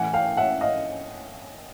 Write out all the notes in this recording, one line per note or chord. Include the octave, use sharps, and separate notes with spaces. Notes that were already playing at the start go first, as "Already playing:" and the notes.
Already playing: A2 E3 F#5 G#5
F5 G5
E5 F#5
D#5 F5